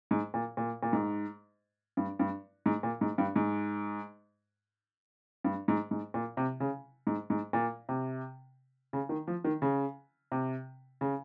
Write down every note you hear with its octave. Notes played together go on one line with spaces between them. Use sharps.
G#2
A#2
A#2
A#2
G#2
G2
G2
G#2
A#2
G#2
G2
G#2
G2
G#2
G#2
A#2
C3
C#3
G#2
G#2
A#2
C3
C#3
D#3
F3
D#3
C#3
C3
C#3